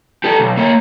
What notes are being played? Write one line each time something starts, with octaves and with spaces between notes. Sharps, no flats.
G4 A4
B1
A#3 C#5